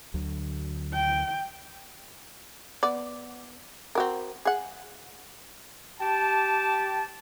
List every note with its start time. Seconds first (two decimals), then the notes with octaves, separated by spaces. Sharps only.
0.14 D2 D3 F#3
0.93 G5
2.83 B3 D5
3.95 C4 F#4 A#4
4.45 G#4 F#5
6.01 G4 A5